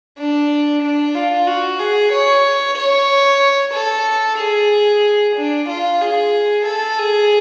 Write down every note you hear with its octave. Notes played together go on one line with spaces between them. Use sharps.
D4
D4
F4
F#4
G#4
C#5
C#5
A4
G#4
D4
F4
G#4
A4
G#4